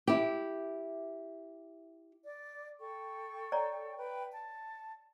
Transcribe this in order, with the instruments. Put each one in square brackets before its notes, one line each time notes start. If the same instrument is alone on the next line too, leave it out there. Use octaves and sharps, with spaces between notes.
[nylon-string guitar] E4 G4
[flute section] D5
A4 G5 C#6
[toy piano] C#5 D5 A#5
[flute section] B4 G5
A5